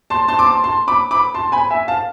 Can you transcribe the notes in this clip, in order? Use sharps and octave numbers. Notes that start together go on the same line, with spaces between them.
A5 C6
A5 C6
D6
A5 C6
A5 C6
B5 D6
B5 D6
A5 C6
G#5 B5
E5 G#5
F5 A5